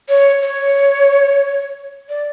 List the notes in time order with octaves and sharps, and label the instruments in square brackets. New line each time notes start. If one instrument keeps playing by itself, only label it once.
[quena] C#5
C#5
D5